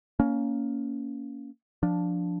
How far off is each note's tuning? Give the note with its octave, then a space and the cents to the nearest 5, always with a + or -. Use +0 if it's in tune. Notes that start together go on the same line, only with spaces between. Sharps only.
A#3 +0 C#4 +20
F3 +10 D4 +0